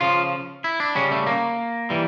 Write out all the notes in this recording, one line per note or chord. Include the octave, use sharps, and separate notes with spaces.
C#3 F3 F4
E4
D4
C#3 G3 C#4
A3
A#3
E3 G3